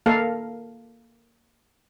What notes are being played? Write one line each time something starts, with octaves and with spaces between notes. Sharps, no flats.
A#3 A4 A#4 F5